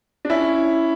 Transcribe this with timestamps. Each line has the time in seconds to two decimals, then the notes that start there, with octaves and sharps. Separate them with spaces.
0.25 D4
0.30 C#4 E4